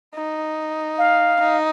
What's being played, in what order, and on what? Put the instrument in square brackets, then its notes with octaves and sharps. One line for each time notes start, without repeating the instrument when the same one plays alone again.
[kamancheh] D#4
[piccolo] F5
[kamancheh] D#4